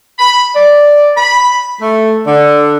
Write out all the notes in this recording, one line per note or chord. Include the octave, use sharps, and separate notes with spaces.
B5
D5
B5
A3
D3